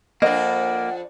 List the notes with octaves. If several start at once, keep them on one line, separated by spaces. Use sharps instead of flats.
F2 A#3 D4 D#5 F#5